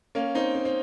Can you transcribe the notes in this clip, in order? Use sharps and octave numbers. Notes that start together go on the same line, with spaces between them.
A#3 C#4
C4 D#4
C4
C4